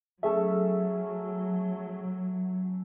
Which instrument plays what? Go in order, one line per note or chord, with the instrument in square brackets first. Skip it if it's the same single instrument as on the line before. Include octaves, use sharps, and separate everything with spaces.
[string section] F#3 [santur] A3 C#4 A4 [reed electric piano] G#4 E5